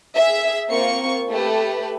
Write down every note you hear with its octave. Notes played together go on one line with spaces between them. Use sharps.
G#4 E5
A#3 C4 F4 C#6 C#7
A3 G4 B4